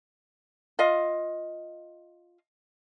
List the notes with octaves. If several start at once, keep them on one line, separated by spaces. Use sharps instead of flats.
F4 D#5 F5